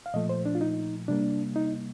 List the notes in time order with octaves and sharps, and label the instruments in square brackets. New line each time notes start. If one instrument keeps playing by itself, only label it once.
[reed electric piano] F5
A#2 F3 A3 D#5
C5
D4
F4
D#4
C3 G3 A#3 D4
D#4